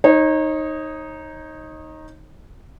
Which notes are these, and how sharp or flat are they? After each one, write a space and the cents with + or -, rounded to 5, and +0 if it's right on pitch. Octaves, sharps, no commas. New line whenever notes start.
D#4 +0 C#5 -35